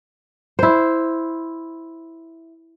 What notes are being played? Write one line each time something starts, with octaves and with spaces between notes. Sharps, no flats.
E4 C5